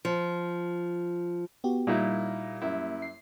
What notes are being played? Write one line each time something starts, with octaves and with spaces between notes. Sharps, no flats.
F3
B3 F#4 G4
A#2 G3 A#3 D#4 E4
F#2 E4
C7